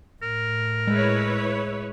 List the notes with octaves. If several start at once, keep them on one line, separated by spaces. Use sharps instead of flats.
A2 A#4
G#3 E4 B4 C#5